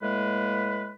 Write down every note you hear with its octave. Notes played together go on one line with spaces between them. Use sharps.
A2 G#3 A#3 B4